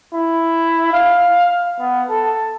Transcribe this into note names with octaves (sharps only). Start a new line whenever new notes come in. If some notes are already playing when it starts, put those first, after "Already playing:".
E4
F5
B3
A4